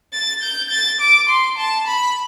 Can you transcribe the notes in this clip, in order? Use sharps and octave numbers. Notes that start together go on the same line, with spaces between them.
A6
G6
A6
D6
C6
A5
B5